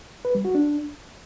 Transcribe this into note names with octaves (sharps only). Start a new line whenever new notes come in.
B4
G3
F#4
D4